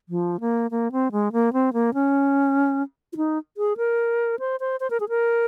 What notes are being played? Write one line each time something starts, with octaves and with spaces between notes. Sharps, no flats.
F3
A#3
A#3
C4
G#3
A#3
C4
A#3
C#4
F4
D#4
G#4
A#4
C5
C5
C5
A#4
G#4
A#4